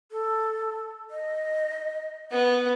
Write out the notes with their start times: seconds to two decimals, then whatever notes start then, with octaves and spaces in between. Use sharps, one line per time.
0.12 A4
1.10 D#5
2.31 B3 F#5